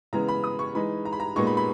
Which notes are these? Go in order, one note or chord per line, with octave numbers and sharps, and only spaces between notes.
C#3 E3 G#3 B3 A#5
B5
D#6
C#6
E3 G#3 D#4 B5
A#5
B5
A#5
A#2 G#3 B3 D#4 C#6
B5
B5